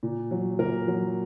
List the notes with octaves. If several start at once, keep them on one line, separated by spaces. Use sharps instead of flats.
A#2
F#3
A#2 A#4
F#3